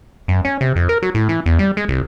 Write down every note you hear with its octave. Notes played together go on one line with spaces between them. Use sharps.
F#2
C#4
C3
F2
A#4
F#3
A2
E3
E2
G3
G#3
C2